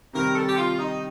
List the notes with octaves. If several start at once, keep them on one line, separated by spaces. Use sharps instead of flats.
C3 D#3 G3 A#4
A4
G4
F4
D#4